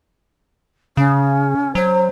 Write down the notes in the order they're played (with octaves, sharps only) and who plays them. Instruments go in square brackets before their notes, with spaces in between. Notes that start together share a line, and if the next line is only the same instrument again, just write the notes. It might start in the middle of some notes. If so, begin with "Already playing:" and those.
[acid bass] C#3 [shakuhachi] C#4
[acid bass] F#3 [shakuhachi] C5